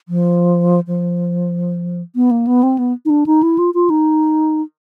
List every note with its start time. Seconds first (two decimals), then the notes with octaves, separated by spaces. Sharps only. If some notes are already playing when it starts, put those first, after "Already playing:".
0.09 F3
0.87 F3
2.16 B3
2.31 A#3
2.47 B3
2.63 C4
2.79 B3
3.05 D#4
3.10 D4
3.26 D#4
3.43 E4
3.58 F4
3.74 F4
3.90 D#4